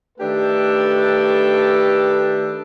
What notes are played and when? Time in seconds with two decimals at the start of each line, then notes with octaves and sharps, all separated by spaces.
0.19 D#3 A3 D4 G4 A4 B4